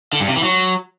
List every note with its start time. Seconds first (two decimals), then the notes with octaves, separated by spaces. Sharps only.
0.13 D3
0.20 G2
0.28 C3
0.36 E3
0.43 F#3